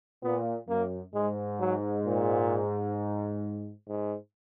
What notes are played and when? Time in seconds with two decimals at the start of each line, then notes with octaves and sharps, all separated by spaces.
0.23 A#2 B3
0.68 F#2 A#3
1.14 G#2 G#3
1.60 F#3
2.06 A#2
3.88 G#2